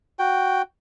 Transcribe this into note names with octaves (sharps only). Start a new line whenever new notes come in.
F#4 G5